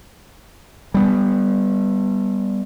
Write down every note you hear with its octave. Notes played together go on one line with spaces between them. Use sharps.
G3 B3